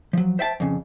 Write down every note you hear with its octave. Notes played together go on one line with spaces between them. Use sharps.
F3 F#3
C5 E5 G5 A5
F2 C#3